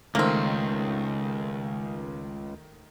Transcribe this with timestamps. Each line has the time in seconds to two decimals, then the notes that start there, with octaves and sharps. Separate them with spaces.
0.15 C#2 D#3 A3 A#3 C4